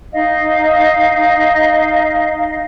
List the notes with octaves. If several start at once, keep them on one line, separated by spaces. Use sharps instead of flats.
D#4 D#5 F5